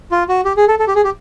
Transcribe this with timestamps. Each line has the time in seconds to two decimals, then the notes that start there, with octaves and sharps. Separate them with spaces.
0.12 F4
0.29 F#4
0.45 G4
0.57 G#4
0.68 A4
0.79 A4
0.88 G4
0.96 G#4
1.04 G4